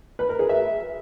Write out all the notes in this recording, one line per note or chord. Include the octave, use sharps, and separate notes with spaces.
B4
A#4
G#4
E5